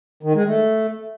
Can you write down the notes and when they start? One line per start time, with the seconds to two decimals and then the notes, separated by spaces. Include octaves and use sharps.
0.23 D#3
0.35 G#3
0.46 A3